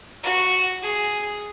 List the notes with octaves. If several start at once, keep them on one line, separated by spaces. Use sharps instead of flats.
F#4
G#4